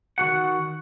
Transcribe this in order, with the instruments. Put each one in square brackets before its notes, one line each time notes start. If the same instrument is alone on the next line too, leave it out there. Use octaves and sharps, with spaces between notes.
[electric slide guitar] D#3 F3 F#4 F#5